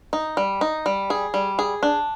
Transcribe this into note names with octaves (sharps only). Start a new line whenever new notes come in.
D#4
G3
D#4
G3
G#4
G3
G#4
D4